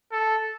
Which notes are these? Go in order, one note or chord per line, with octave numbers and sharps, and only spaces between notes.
A4